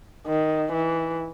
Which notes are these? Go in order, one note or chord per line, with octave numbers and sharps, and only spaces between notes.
D#3
E3